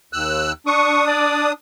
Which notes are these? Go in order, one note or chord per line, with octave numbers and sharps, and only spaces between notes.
D#2 E6 F#6
D4 C#6 D#6
D5